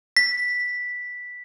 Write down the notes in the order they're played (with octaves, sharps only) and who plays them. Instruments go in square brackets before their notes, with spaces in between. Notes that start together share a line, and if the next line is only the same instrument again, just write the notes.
[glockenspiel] B6